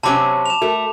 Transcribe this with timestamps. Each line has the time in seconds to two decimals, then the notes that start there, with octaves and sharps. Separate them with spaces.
0.03 C3 F#3 C#4 A5 B5 D6
0.46 E7 F7
0.62 A3 F#4 A#4